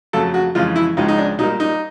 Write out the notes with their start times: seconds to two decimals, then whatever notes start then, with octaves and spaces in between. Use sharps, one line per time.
0.13 F2 C#3 F#3 A3 A4
0.34 F#4
0.55 F2 C#3 E3 G#3 F4
0.76 E4
0.97 C#2 C#3 F3 G#3 D#4
1.08 D#4
1.18 D4
1.38 A#2 G3 A#3 D#4
1.60 D#4